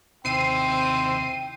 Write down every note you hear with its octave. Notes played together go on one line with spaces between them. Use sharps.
D#2 C3 C4 E4 G5 C7 D#7